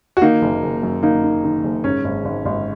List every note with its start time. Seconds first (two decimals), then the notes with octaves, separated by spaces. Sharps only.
0.17 F#4
0.22 D#3 A#3 D#4
0.42 F#1
0.62 F#1
0.83 F#2
1.03 D#3 A#3 D#4
1.23 D#3
1.44 D#3
1.64 F#1
1.84 G#2 C#4
2.05 G#1
2.25 G#1
2.46 G#1